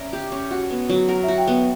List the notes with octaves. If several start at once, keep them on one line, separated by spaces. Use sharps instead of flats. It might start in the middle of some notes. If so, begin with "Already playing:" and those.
Already playing: C#4 A#4 D5 E5
G4
C#4
F#4 F#5
B3
F#3
A#4 F#5
F#4 E5
G5
B3 F#5